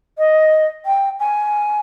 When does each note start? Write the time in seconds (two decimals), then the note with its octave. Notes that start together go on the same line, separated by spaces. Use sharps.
0.18 D#5
0.86 G5
1.20 G#5